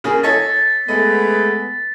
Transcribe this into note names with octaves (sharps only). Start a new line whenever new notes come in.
C#3 A#3 G#4
A4 C#5 D#5 A6 B6
G#3 A3 B3 D#5